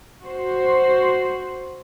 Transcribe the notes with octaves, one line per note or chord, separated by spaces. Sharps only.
F#4 C5